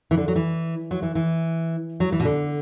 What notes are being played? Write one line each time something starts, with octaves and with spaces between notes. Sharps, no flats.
E3
D3
F#3
E3
F#3
E3
E3
F#3
E3
B2
D3